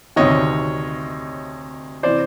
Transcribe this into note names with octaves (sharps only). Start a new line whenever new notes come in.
D2 C3 D#3 C#5 D#5
C3 E3 C5 D5